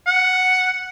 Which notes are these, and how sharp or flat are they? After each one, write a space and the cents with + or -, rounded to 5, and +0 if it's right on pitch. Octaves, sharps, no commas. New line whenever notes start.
F#5 +0